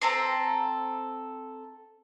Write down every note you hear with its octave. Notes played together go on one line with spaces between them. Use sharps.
C4 A4 A#5 C6